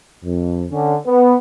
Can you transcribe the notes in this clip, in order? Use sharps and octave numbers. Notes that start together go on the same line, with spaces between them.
F2
D3 C#4
B3